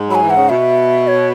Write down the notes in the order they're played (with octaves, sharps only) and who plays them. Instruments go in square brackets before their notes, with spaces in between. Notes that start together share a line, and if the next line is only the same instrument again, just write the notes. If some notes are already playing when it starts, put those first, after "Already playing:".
Already playing: [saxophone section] G#2
[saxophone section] F#3 [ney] B5
[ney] G#5
[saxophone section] E3
[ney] F#5
[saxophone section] C#3
[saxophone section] B2 [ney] E5
[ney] C#5